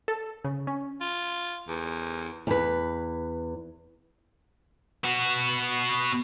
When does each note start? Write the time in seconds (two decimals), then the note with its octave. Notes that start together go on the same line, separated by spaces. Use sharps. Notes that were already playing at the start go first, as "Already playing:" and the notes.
0.08 A4
0.44 C#3
0.67 C#4
1.01 F4
1.68 E2
2.47 E2 B4
5.04 B3 F#4